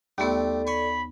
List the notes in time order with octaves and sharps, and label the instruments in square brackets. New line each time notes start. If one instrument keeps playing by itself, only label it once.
[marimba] D#2 B3 [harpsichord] G3 A3 C4 [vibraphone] A4 D5
[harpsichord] C#5 G#5 [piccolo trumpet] B5